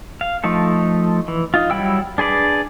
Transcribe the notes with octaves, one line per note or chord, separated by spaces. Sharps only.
F5
F3 A3 D#4 A4
E3
D#4 F4
F#3 G3 E4 G5 E6
D4 G#4 B4 D5